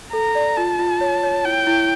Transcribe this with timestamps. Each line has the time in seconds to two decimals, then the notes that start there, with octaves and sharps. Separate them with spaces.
0.13 A4 A#5
0.35 D5
0.57 F4 A5
0.79 F4
1.01 C#5
1.23 C#5
1.44 E4 G5
1.67 E4